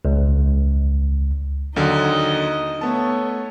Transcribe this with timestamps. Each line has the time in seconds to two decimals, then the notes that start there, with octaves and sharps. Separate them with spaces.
0.05 C#2
1.76 D#2 D3 F#3 D#4 D#5
2.81 A3 B3 C#5 A5